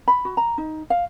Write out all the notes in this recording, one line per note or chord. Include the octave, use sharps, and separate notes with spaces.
B5
F#4
A#5
D#4
F5